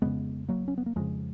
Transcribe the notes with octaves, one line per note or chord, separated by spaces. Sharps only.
F2 C#3 G#3 B3
F#3 A#3
C#4
B3
A#3
F2 C#3 F3 G#3